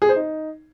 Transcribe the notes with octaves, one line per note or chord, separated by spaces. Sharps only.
G#4
C5
D#4